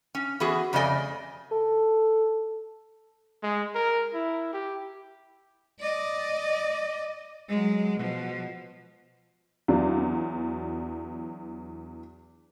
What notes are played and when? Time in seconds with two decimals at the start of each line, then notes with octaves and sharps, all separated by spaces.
0.15 C#4
0.40 E3 B3 F#4 G#4
0.73 F2 C#3 A3 D5 D#5 G#5
1.51 A4
3.43 G#3
3.75 A#4
4.14 E4
4.53 G4
5.80 D5 D#5
7.49 F#3 G#3
7.98 B2 F3
9.68 E2 F#3 D4 F4